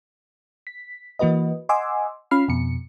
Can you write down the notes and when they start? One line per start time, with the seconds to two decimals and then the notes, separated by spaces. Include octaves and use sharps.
0.67 B6
1.19 E3 A#3 F#4 B4 D#5
1.69 D#5 F#5 G#5 C6 D6 E6
2.31 C#4 F4 B5 F6 C7
2.48 F2 B2 C#7